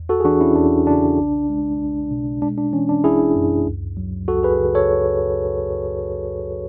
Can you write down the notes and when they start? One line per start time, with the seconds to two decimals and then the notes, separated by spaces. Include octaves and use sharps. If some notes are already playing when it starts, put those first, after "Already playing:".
Already playing: E2
0.09 F#4 A4
0.20 G#4
0.24 E3 D4 F#4
0.41 C#4 E4
0.55 E2 D4
0.87 C#3 D4
1.18 B1
1.49 G#3
1.80 B1
2.11 B2
2.42 G#3 D4
2.58 D4
2.73 E3 C#4
2.89 D4
3.04 G#1 E4 G#4
3.36 F#2
3.66 C#2
3.97 F#3
4.28 C#2 F#4 A4
4.43 G#4 B4
4.59 C#3
4.75 A4 C#5